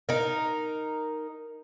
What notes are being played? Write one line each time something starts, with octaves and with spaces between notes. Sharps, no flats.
D#4 A#4